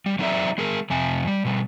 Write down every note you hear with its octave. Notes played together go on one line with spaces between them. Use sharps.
G3
F#3 C4 D#4 A4 D5 E5
G#3 G#4 A#4
F2 C3 G#5
G3
B2 G3